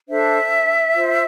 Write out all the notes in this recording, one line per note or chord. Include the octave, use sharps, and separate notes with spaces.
D4 A4 C5 E5
F4 C5